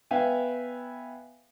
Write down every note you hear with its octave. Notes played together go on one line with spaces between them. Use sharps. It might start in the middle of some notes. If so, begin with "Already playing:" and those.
B3 B4 E5 F5 G5 G#5